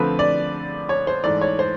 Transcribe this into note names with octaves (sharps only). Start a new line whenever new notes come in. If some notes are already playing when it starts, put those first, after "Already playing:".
Already playing: D3 F3 A3 C4 B4
D5
C#5
C5
G#2 E3 A3 D5
C#5
C5